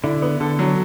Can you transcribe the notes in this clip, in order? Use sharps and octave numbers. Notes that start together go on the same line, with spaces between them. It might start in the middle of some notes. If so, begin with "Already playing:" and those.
D3 E4
B3
D3 A4
F#3